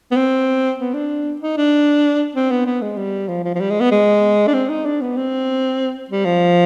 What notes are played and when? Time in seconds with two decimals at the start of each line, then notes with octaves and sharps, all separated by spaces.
0.11 B3
0.16 C4
0.79 B3
0.94 D4
1.41 D#4
1.57 D4
2.35 C4
2.51 B3
2.66 B3
2.82 G#3
2.97 G3
3.28 F3
3.44 F3
3.55 F3
3.60 G3
3.70 G#3
3.80 B3
3.92 G#3
4.47 D4
4.54 C4
4.69 D#4
4.86 D4
5.01 B3
5.17 C4
6.10 G3
6.25 F3